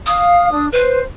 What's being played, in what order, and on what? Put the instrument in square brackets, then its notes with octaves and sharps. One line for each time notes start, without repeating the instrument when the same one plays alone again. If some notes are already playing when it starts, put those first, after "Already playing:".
[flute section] F5 [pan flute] D#6
[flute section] D4
[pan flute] B4 [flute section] C5